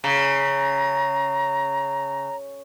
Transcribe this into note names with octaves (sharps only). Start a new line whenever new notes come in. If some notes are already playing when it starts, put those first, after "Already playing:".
C#3 A#5